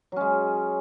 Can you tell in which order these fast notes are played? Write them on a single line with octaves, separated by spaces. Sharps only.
F#3 C#4 G#3